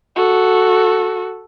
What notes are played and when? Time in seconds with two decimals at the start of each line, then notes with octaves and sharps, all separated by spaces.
0.16 F#4 A4